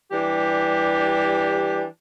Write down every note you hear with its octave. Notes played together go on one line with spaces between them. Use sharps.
E3 G3 D4 G4